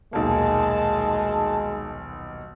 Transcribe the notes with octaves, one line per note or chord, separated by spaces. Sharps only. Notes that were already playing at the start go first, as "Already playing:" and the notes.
D#1 B1 G#3 A#3 A5